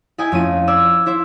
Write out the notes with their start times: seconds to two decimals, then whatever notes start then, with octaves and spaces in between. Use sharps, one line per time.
0.18 E4 G#4 D#5 G5 G#5
0.32 F2 A3 C#4 F4 D#7
0.67 C5 D5 E6 G#6
1.06 E4 C5 E5